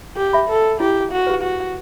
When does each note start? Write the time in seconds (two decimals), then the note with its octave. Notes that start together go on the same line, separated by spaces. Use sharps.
0.17 G4
0.33 E5 B5
0.49 A4
0.80 E4 G4
1.12 F#4
1.27 G4 B4
1.43 F#4